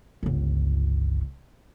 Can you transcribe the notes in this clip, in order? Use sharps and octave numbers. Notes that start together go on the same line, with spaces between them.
G1 C#2